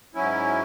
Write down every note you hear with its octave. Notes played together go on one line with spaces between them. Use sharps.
G#2 F#3 C#4 E4